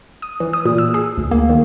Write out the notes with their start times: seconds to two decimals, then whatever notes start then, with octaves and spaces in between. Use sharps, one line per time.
0.22 D#6
0.40 E3
0.53 D#6
0.66 A#2
0.78 E6
0.94 G#4
1.18 D2
1.31 A#3
1.50 D#3